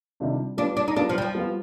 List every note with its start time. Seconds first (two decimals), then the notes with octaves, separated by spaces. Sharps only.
0.20 C3 D#3 G3 D4 F4
0.57 G3 B3 D4 F4
0.77 D4
0.88 D#4
0.96 G3 B3 D4 F4
1.09 F3
1.18 G3
1.22 F3
1.35 G3 B3 F4